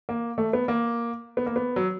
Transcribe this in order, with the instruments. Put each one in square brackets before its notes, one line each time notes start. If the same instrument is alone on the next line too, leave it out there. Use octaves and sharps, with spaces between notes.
[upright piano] A#3
A3
B3
A#3
B3
A#3
B3
F#3